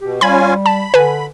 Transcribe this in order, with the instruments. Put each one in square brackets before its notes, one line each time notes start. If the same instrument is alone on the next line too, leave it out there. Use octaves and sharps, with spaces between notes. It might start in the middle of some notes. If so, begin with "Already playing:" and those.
[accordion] B2 [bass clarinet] G4
[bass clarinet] G3 [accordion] C#4 F4 G#5 [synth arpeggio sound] B5 G#6
[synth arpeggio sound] A5 [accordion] B5
[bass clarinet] D3 [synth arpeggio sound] B4 G#5